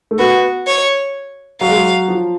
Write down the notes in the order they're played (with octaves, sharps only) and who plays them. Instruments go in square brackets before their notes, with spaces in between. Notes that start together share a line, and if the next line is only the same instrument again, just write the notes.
[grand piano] A3
[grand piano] B3 [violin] F#4
[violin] C#5
[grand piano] F#3 [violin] F5
[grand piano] G#3
F#3
F3